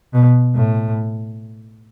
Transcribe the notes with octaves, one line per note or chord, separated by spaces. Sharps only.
B2
A2